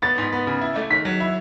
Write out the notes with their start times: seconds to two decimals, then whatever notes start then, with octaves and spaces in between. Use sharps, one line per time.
0.02 B3 A6
0.18 G#2
0.32 B3
0.47 C#3
0.61 E4
0.76 A3
0.91 D#3 B6
1.05 F#3
1.20 E4